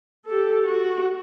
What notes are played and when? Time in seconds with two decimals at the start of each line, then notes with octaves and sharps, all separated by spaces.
0.29 G4 A4
0.66 F#4